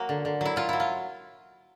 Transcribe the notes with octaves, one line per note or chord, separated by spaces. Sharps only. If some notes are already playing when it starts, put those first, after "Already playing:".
Already playing: F#3 A#3 F#4
D3
D3
F#3 E4
F#3 F4
F#3 E4
F4